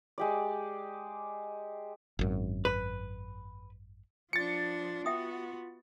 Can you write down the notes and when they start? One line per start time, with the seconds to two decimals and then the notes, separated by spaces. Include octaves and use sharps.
0.18 G#3 G4 D5
2.19 G#1 F#2
2.65 B4
4.33 F3 D4 F4 A6 C#7
5.06 B3 F#4 E5 G5 D#6